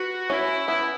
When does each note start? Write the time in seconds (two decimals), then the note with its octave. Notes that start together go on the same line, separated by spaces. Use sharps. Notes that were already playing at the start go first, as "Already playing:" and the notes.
Already playing: F#4 B4
0.30 C#4 E4
0.68 B3 E4